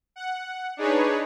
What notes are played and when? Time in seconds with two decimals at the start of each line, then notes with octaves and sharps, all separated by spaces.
0.16 F#5
0.77 D4 D#4 G#4 B4 C#5